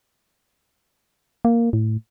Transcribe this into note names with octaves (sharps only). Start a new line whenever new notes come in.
A#3
A2